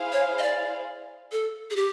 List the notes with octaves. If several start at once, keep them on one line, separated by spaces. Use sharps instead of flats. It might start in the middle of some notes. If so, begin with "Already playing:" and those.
Already playing: E4 G#4 C5 F5
C#5
D#5
D5
A4
G#4
G4